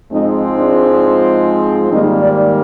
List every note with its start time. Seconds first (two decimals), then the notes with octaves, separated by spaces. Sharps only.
0.11 G#2 F3 G#3 C4 D#4
0.57 D4
1.92 G#2 D#3 G3 A#3 D#4
2.23 D5